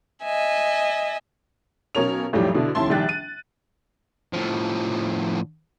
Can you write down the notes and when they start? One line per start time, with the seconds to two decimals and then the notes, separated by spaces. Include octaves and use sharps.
0.23 D#5 E5 G#5
1.95 B1 B2 C#4 A#4 C#5 F7
2.33 B1 F2 A2 F#3 G3 G4
2.55 B2 D3 D4 E4
2.75 F1 D#2 C#4 E4 A5 C6
2.90 A#1 D#3 G3 G5 F#6 A6
3.09 D#7
4.33 A2 F3